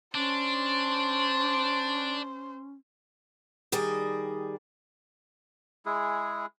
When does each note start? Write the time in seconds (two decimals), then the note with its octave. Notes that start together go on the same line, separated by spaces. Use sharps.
0.15 C#4 D4 C5
3.72 D#3 G3 G#4 D5 D#5
5.86 G#3 E4 G#4